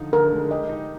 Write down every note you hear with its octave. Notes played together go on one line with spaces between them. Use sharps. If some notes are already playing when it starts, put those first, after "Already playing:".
Already playing: D3 F3 D#4
D3 A#4
G#3
G4 D#5
D#4